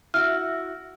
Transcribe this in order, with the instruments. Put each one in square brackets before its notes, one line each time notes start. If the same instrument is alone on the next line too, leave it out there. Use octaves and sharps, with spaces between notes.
[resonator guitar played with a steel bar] E4 F#4 [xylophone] F6